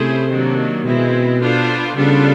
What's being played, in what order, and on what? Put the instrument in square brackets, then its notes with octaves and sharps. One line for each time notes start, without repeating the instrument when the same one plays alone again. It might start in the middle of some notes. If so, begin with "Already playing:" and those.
Already playing: [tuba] C3 [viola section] A3 C#4 E4 G#4 C5
[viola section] D#3 F#3 A#3 D4
[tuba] B2 [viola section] G#3 C4 E4
[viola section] B3 D4 F4 A4 C5
[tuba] C#3 [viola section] G3 B3 D4 F4 A4